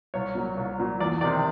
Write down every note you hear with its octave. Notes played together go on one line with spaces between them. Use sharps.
C2 C#5
A#2 F#3
C2
A#2 F#3
E2 D5
C3 D#3 D5